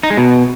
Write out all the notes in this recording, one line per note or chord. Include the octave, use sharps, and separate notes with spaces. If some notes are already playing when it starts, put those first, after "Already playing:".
D#4
G#3
B2